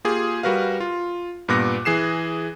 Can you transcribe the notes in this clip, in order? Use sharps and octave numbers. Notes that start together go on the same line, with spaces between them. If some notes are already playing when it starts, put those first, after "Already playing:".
A#3 F4 G4 G#4
G3 F#4 A#4 B4 F5
F4
G2 A#2 B3 D6 F#6 A#6
E3 G#4 C7 E7